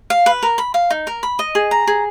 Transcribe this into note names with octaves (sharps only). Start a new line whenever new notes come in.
F5
B4
A#4
B5
F5
D#4
A#4
B5
D#5
G#4
A#5
G#4